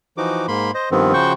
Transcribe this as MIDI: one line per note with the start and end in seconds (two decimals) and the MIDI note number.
0.17 0.46 52
0.17 0.46 53
0.17 0.46 63
0.17 0.46 66
0.17 0.46 86
0.48 0.71 44
0.48 0.71 58
0.48 0.71 83
0.48 0.71 84
0.74 0.89 72
0.74 0.89 75
0.91 1.13 43
0.91 1.13 51
0.91 1.13 53
0.91 1.13 59
0.91 1.13 60
1.14 1.33 49
1.14 1.33 53
1.14 1.33 66
1.14 1.33 72
1.14 1.33 79
1.14 1.33 85